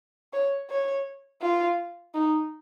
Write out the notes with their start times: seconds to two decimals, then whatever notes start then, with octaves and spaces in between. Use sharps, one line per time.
0.33 C#5
0.70 C#5
1.42 F4
2.14 D#4